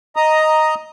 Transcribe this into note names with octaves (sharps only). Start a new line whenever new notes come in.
D#5 A#5 D#6